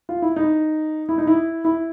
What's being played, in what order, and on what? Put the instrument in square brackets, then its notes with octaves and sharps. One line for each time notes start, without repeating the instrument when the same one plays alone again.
[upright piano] F4
E4
D#4
E4
D#4
E4
E4